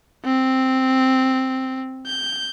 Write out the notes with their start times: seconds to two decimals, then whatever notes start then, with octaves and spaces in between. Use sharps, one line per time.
0.24 C4
2.06 G6